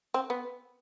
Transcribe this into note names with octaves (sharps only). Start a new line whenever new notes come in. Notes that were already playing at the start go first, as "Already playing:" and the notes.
C4
B3